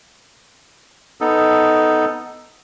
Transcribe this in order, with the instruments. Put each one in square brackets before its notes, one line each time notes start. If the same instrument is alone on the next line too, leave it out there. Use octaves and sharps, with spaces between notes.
[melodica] B3 D#4 A4